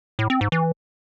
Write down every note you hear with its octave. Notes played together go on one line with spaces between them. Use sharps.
A2
C4
G#2
E3